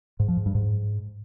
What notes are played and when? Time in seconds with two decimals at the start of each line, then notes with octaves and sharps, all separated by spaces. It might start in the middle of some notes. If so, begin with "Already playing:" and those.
0.20 G#2
0.28 F3
0.37 G#2
0.46 G2
0.55 G#2